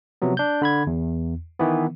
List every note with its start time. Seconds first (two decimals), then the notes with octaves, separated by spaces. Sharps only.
0.22 C3 F3 F#3 B3
0.37 D4 G6
0.62 D3 B5 G#6
0.87 E2
1.59 D#3 E3 B3